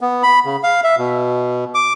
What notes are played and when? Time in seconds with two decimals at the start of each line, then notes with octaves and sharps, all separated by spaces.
0.01 B3
0.23 B5
0.45 C#3
0.63 F5
0.84 E5
0.98 B2
1.75 D6